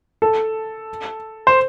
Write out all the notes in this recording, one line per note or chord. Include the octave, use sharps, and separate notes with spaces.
A4
C5